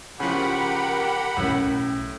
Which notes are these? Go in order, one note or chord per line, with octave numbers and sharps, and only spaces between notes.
C#3 F3 G4 A#4 F#5 B5
B1 A2 C#4